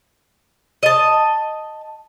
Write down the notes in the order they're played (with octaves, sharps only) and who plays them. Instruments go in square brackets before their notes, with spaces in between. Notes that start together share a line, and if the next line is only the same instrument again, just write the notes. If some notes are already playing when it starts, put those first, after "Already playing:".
[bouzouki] D#5 A5